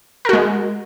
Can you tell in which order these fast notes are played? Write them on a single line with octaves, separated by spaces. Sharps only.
A#4 F#4 G#3